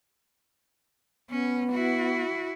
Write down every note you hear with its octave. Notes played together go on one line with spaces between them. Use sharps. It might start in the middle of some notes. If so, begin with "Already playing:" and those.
B3 C#4
E4 F#4